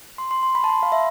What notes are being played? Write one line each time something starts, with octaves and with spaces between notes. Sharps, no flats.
C6
C6
C6
B5
A5
C6
B5
F5
E5